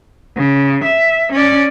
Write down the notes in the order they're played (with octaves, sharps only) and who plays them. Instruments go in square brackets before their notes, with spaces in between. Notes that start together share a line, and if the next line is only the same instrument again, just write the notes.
[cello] C#3
E5
C#4 D5